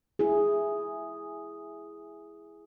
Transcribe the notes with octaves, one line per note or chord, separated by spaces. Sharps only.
E4 G#4